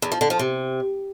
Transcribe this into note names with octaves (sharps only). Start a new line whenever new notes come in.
E2
F3
D3
F3
C3